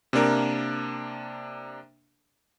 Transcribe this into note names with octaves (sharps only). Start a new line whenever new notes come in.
C3 A#3 D4 A#4